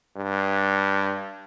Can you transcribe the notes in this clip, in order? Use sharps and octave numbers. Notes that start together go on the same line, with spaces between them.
G2